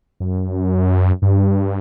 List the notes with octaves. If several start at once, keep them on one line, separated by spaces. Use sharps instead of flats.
F#2
G2